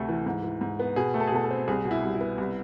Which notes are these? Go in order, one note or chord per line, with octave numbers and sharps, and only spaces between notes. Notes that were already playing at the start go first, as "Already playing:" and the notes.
Already playing: D2 C3 A3
E3
G#2
E3
G#2
B3
B2 G#4
A3
A4
G#4
B2 A4
A4
C4
C2 G#4
B2
E4
C2
E4
B3
C2